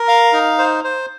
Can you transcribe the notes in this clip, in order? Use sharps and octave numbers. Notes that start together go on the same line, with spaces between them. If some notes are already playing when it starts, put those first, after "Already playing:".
Already playing: A#4
F5
D#4
C5
C5